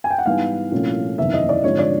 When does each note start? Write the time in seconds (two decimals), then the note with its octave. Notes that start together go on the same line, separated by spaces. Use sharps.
0.04 G#5
0.10 G5
0.18 F#5
0.26 G#2 E3 G3 B3 F5
0.71 C2 A#2 F3 A3 C#4
1.18 F#1 E2 C3 D#3 E5
1.34 D#5
1.49 D5
1.64 G#1 G2 D3 F3 G#3 C#5
1.78 D5